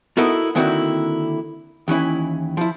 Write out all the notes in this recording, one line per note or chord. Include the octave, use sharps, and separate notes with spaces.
B3 D#4 E4 F#4 A4 A#4
D3 D#3 A#3 C4 E4 F#4
D#2 E3 C#4 E4
F3 E4